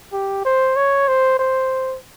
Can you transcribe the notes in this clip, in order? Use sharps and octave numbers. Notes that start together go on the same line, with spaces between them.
G4
C5
C#5
C5
C5